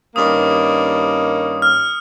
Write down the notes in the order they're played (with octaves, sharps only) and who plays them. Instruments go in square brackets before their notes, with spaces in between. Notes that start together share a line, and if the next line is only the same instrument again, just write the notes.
[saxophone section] G2 D#3 A#3 C#4 [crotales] D#6
[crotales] F6